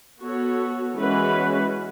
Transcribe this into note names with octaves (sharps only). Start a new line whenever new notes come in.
B3 F#4 A4 C#5
E3 G#3 C#4 F#4 B4